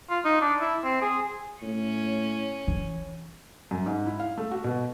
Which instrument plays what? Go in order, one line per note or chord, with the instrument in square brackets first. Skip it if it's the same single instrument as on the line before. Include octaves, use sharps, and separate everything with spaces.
[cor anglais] F4
D#4
D4
E4
C4
G#4
[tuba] A2 [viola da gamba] C#4
[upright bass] E3
[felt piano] F#2
G#2
E4
F5
A3
F#4
B2